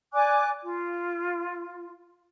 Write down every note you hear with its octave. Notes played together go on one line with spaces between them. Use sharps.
D5 G#5 D6 F#6
F4